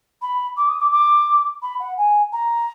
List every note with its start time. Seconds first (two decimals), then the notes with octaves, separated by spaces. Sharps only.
0.22 B5
0.57 D6
0.68 D#6
0.80 D6
0.91 D6
1.62 B5
1.80 F#5
1.97 G#5
2.32 A#5